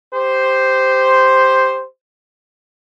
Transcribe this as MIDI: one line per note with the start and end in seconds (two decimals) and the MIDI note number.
0.13 1.86 67
0.13 1.86 72